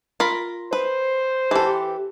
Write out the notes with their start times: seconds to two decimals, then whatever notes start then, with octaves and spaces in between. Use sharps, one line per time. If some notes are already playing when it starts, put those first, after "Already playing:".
0.20 F4 A#4 B5
0.73 B4 C5
1.51 E3 G4 A4